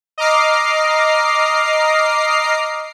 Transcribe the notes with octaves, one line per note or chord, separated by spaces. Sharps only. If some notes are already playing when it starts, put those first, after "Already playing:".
D#5 A#5 D6 F6 C7